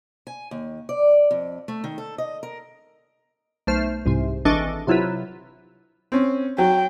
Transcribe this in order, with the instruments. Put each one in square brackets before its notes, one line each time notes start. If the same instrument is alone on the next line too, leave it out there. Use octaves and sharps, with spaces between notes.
[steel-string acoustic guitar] G#5
D#2
D5
F2
A3
D#3
A4
D#5
A#4
[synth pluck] B1 A3 C5 F6
C2 G#2 C3
G#1 E3 D4 A4 D#5 C#6
C3 F#3 E4 F4 B4
[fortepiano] C4 C#4
[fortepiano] F#3 [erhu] G5